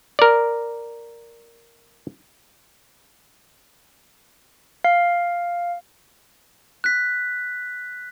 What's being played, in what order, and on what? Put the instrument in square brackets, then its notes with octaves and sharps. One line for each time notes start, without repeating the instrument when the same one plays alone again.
[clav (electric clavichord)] A#4 D5
[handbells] F5
[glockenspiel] F#6 B6